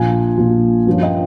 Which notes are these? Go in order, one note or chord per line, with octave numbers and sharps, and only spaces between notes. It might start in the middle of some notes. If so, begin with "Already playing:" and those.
Already playing: A#1 A#2 F3 F5 G#5
A#1 A#2 F3
G2 F3 A#3 C#4
D#5 G5